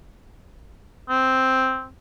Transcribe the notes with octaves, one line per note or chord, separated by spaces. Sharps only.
C4